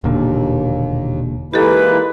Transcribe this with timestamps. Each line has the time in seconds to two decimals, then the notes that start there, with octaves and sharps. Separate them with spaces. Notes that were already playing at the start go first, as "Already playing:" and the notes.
0.04 E1 D#2 A#2 D3
1.54 E3 G#3 A#3 D#4 E4 G4 A4 B4